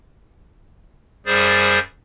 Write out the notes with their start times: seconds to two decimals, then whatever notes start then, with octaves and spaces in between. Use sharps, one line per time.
1.26 F#2 G3 G#4 C5 A6